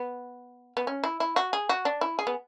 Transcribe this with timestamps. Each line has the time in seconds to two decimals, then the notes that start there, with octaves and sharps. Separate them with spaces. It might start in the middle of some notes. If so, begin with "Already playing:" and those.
Already playing: B3
0.77 B3
0.87 C#4
1.04 E4
1.20 E4
1.36 F#4
1.53 G#4
1.69 F#4
1.85 D4
2.01 E4
2.19 G#4
2.27 B3